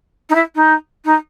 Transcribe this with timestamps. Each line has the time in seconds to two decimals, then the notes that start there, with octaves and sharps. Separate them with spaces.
0.29 D#4
0.35 E4
0.55 D#4
1.05 D#4